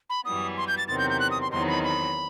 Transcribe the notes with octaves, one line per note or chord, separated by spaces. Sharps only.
B5
F#2 E3 G3 B3 D#6
C6
G6
A6
E2 C3 D#3 F#3 C4 A6
G6
G6
F#6
D#6
C6
E2 D#3 F#3 C4 D#4 C6
B5
B5